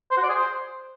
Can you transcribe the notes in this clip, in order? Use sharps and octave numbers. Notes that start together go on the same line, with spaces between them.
C5
F#4
D5
G#4
C5